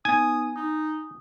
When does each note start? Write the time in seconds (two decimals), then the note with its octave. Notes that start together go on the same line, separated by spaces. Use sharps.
0.05 B3 D#4 G#5 D#6
0.56 D#4 D#6